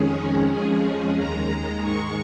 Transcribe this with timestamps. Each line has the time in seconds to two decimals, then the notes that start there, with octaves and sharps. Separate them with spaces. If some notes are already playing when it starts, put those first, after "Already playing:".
Already playing: F2 D#3 G#3 C#4 G#4
0.52 F2 F3 G#3 C#4 G#4
1.17 D#2 D#3 G#3 A#5
1.83 G#2 D#3 G#3 C#6